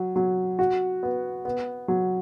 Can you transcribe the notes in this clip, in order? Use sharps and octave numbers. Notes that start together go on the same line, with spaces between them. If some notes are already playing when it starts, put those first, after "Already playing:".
Already playing: F#3
F#3
F#4
B3
B3
F#3